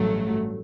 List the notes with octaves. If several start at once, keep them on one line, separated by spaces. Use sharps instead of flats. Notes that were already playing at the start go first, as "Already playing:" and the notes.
Already playing: A1 G2 F#3 A3